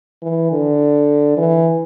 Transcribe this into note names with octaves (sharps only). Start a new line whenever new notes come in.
E3
D3
E3